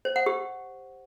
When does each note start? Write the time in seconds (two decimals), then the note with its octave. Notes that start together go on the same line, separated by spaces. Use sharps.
0.05 C5
0.16 F#5
0.26 G4